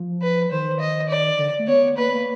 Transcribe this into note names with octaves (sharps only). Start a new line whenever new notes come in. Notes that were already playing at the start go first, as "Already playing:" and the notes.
Already playing: F3
B4
D#3 C5
D#5
D5
D3
A3
B3 C#5
A#3 B4
A#3